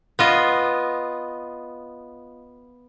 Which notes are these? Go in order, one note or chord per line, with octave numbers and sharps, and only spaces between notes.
B3 F4 D#5